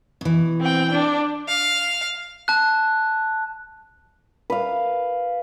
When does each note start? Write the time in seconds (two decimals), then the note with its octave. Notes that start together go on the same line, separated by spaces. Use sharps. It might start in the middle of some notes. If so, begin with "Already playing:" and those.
0.21 B2 E3
0.61 C4 G5
0.92 D4
1.48 F5
2.48 A5 F#6
4.50 B4 F5